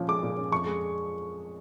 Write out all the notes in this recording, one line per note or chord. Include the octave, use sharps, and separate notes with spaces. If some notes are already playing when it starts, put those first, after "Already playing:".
Already playing: A#2 F3 C#4
G#3 D6
A#2
C#4
F2 C#6
G#3